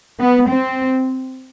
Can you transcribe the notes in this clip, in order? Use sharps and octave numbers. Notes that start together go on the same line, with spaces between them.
B3
C4